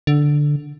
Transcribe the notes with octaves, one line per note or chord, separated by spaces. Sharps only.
D3